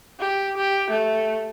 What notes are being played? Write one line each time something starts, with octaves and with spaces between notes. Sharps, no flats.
G4
G4
A3